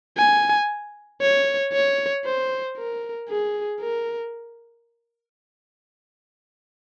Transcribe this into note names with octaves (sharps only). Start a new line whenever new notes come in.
G#5
C#5
C#5
C5
A#4
G#4
A#4